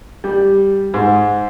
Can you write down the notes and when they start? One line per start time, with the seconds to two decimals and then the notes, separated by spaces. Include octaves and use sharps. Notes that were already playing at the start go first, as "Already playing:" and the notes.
0.24 G3
0.94 G#2